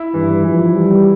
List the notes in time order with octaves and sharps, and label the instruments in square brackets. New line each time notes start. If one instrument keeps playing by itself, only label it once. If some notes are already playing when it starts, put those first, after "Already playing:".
Already playing: [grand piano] E4
[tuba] G2 [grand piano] E3
[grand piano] E3 [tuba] F3
[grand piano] E3 [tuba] G3